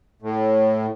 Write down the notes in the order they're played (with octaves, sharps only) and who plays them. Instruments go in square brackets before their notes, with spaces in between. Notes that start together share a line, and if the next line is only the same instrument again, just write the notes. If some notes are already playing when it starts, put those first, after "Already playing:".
[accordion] A2